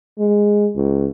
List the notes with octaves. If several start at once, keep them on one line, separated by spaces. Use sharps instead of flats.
G#3
C#2